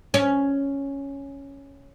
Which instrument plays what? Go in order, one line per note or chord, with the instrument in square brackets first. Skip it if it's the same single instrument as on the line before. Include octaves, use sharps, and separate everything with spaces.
[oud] C#4